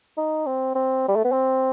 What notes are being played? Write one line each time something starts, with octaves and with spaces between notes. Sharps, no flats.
D#4
C4
C4
G3
A3
B3
C4